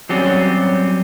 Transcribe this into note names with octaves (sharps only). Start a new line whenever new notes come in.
F#3 G3 C4 C#4 G4